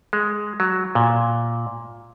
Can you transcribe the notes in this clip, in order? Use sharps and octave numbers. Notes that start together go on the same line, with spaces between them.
G#3
F#3
A#2